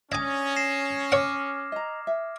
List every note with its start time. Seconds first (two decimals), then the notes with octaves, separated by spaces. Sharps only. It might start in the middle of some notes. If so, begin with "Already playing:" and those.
0.12 C#4 D4 E5 G#5 D#6 G#6 A#6
0.56 A#6 C7 E7
1.12 C#5 F#5 D6 F6
1.72 D#5 A#5
2.07 E5